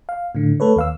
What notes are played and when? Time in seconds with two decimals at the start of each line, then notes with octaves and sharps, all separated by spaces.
0.09 F5
0.35 A2 D3
0.60 A3 A4 B4 C#5
0.76 D#2 F5 E6